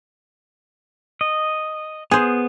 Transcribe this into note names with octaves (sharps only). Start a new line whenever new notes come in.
D#5
B3 G#4 C5